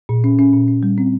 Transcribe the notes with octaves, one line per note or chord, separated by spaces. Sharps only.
A#2
C#4
C#4
A#2
C#4
G3
C4